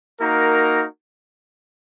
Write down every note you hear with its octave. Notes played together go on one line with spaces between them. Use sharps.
A#3 D#4 F#4 A#4